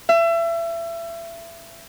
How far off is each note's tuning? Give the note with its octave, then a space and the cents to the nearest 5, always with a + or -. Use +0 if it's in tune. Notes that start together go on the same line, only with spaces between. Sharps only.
E5 +30